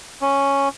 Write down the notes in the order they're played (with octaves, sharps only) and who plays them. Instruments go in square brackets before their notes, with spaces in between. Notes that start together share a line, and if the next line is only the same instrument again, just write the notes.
[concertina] C#4